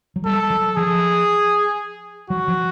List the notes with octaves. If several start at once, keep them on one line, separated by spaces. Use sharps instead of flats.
F#3
G3 A4
F#3
F3 G#4
F#3 F#4
F3